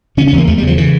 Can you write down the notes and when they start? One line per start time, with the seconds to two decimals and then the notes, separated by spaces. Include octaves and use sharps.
0.17 C#3 C#4
0.27 C#4
0.32 E2
0.38 A#3
0.47 E2 A3
0.58 G3
0.62 C#3 F3
0.78 C#3 E3